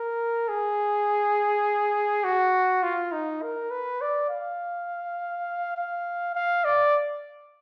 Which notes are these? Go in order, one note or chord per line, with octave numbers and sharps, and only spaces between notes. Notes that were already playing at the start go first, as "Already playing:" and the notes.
Already playing: A#4
G#4
F#4
F4
D#4
A#4
B4
D5
F5
F5
F5
D5